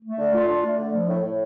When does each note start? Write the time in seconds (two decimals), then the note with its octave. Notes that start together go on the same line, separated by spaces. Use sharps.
0.03 A3
0.19 D3
0.33 F4
0.48 D4
0.64 A3
0.78 D3
0.94 F3
1.08 A2
1.24 A2